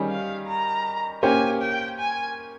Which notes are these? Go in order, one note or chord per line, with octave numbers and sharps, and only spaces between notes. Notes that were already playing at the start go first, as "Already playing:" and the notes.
Already playing: D#3 G3 C#4 G#4
F5
A#5
A#3 C#4 G4 C5 G#5
G5
G#5